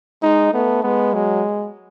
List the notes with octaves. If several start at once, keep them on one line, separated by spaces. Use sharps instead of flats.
G#3 D#4
A3 B3
G#3 B3
F#3 G#3